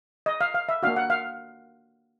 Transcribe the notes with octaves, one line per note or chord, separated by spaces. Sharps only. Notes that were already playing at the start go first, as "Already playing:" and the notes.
D#5
F5
F5
E5
A#3 D4 F#4 F5
F#5
F5